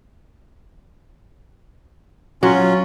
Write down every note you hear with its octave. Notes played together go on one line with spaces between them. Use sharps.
F#3 C#4 F4